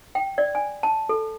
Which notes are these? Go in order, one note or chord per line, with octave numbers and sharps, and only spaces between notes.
G5
D5
G#5
A5
A4